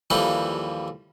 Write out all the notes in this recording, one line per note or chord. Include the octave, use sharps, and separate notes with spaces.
D#2 E3 F3 G3 A4